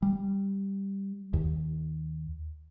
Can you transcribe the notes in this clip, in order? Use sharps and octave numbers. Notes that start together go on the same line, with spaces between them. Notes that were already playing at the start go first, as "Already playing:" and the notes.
G3
D#2